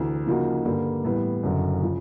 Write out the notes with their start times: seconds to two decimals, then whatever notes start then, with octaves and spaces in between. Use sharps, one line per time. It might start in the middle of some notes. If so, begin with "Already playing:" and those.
Already playing: D2 C3 E3
0.27 C#3 F3 A#3 D#4 F#4
0.65 G2 D3 G3 A#3
1.04 A2 E3 G3 B3
1.43 F#1 F#2 D3
1.82 C#3 F3